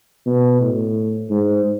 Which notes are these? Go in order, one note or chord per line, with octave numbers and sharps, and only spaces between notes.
B2
A2
G#2